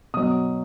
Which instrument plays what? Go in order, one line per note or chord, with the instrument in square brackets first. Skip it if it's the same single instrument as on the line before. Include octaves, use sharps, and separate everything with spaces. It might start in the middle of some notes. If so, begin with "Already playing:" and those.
[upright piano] B2 F#3 D#6